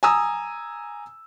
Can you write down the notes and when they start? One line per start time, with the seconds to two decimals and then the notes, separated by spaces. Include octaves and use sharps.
0.03 G#5 A#5 D#6 E6